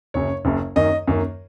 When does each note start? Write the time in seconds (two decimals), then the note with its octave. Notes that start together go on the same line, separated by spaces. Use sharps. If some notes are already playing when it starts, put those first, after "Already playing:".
0.14 F#1 F#2 C#3 C#5
0.45 F#1 F#2 C#3
0.76 F#2 D#3 A#3 D#5
1.07 F#2 D#3 A#3